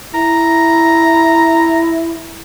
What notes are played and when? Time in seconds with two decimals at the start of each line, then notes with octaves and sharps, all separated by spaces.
0.14 E4 A#5